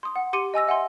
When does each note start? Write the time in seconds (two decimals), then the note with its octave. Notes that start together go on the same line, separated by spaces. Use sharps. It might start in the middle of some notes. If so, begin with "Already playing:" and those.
0.03 C6 D#6
0.16 F#5
0.33 G4 C6 D6 C#7 D#7
0.54 D#5 G#5 E6 A#6
0.67 E5 F#5 G#5 C6